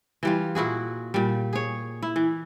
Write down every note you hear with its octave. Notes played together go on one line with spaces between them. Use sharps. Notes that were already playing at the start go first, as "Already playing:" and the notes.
E3 G3 F4
A#2 E4 F#4 G#4
A#2 G3
G#4 C#5
E4
E3